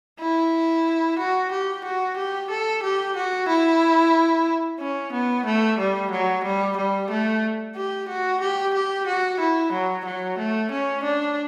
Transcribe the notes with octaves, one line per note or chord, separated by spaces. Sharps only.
E4
F#4
G4
F#4
G4
A4
G4
F#4
E4
C#4
B3
A3
G3
F#3
G3
G3
A3
G4
F#4
G4
G4
F#4
E4
F#3
F#3
A3
C#4
D4